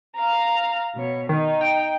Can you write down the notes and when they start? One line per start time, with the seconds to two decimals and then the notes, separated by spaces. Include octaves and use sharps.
0.16 F5 A#5
0.95 B2 C#5
1.29 D#3 D#4
1.61 G5